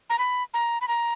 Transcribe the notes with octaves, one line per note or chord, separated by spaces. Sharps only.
A#5
B5
A#5
B5
A#5